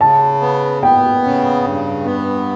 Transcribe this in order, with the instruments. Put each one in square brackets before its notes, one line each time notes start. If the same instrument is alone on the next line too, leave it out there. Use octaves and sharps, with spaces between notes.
[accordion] C#3 [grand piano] A5
[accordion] B3
[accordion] B3 [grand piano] G5
[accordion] C#3
G2
B3